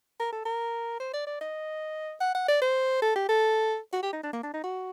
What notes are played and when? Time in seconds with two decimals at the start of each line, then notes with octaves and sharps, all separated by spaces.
0.20 A#4
0.33 A4
0.45 A#4
1.00 C5
1.13 D5
1.26 D5
1.41 D#5
2.21 F#5
2.35 F#5
2.48 D5
2.61 C5
3.02 A4
3.15 G4
3.29 A4
3.93 F#4
4.03 G4
4.13 D#4
4.23 D4
4.33 A#3
4.44 D4
4.54 D#4
4.63 F#4